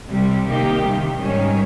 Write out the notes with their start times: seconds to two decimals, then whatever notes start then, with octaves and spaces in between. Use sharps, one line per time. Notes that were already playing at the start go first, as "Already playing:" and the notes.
0.10 C2 C3 G3
0.47 C3 D#3 A#3 D#4 G4
0.84 C2 C3 D#3 G3
1.20 G#2 D#3 G3 C#4